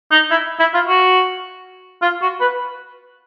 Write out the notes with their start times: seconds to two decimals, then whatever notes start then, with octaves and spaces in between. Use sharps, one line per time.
0.12 D#4
0.31 E4
0.60 E4
0.74 F4
0.87 F#4
2.02 F4
2.21 F#4
2.41 B4